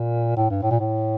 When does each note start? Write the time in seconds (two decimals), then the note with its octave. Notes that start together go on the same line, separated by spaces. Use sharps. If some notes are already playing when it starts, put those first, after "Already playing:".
Already playing: A#2
0.37 A2
0.50 G2
0.63 A2
0.71 A#2
0.79 A2